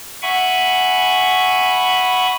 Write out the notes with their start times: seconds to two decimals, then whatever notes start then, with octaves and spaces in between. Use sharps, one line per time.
0.22 E5 F#5 G#5 B5 C#6